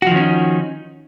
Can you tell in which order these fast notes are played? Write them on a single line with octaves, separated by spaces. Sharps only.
F#4 F3 D#3 C#4 D#4